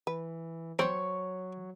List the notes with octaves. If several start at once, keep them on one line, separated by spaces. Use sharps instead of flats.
E3 B4
F#3 C4 C5 C#5 C#6